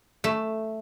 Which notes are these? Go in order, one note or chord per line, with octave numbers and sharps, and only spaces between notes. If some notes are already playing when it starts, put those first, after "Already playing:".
A3